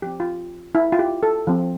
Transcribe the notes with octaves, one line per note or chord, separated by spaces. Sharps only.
F3 C4 G4
F4
E4
F4
G4
A4
F3 C4